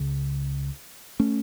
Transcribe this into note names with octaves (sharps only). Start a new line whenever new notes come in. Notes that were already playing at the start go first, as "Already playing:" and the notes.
Already playing: C#2 C#3
A3 C#4